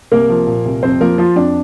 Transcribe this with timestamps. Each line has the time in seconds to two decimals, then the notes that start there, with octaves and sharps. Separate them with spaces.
0.12 C2 A#3 A#4
0.29 F3
0.47 A#2
0.65 C2
0.83 F2 C4 C5
1.01 F3 A#3 A#4
1.18 F3 F4
1.36 F2 D4